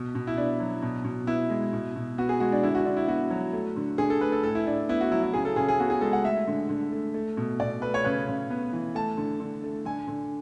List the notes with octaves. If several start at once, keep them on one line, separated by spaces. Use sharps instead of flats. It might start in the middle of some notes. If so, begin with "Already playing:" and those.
Already playing: B2
B2
E4
B3 D4
F#3
B2
B2
B3 E4
G#3
B2
B2
B3 F#4
G#4
G#3 F#4
D4
D3 E4
F#4
D3 D4
E4
B3 F#4
F#3
A3
D3
D3 G#4
A4
A3 B4
A4
A2 A4
E4
A2 D4
B3 E4
F#4
F#3 E4
E4
C#3 G#4
A4
C#3 G#4
G#4
B3 F#4
G#4
G#3 A4
F#5
A3 E5
D3
D3
A3
A3
B2
B2 D5
A3 B4
C#5
C#3 B4
C#3
B3
E3
A3 A5
D3
D3
A3
D3 G#5
D3